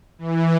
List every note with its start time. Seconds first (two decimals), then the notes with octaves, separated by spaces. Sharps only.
0.19 E3